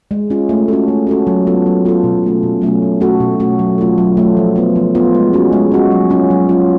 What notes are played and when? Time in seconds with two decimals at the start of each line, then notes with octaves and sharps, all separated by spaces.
0.11 G#3
0.30 C#4 F4
0.49 A3
0.68 C#4 F#4 A4
0.88 A3
1.07 C#4 F#4 A4
1.27 F#3
1.47 B3 F4 A4
1.66 F#3
1.85 B3 F4 A4
2.04 B2
2.23 F#3 A3 C#4
2.43 B2
2.62 F#3 A3 C#4
2.82 B2
3.00 A3 C#4 F#4 A4
3.20 B2
3.40 A3 C#4 F#4 A4
3.59 F#3
3.78 A3 F4 A4
3.98 F#3
4.17 A3 F4 A4
4.37 F3
4.56 B3 F4
4.76 F3
4.95 B3 F4
5.14 G#3
5.33 C#4 F#4
5.53 G#3
5.72 C#4 F#4
5.91 F#3
6.10 C#4 F4
6.30 F#3
6.49 C#4 F4